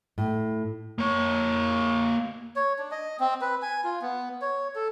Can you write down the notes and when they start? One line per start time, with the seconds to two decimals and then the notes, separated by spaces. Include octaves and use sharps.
0.18 A2
0.98 A#3 C#5
2.56 C#5
2.79 D4
2.91 D#5
3.20 C4
3.41 B4
3.62 G#5
3.84 F4
4.02 B3
4.42 C#5
4.76 A4